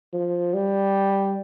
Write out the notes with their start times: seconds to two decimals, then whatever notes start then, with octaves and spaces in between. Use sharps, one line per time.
0.13 F3
0.54 G3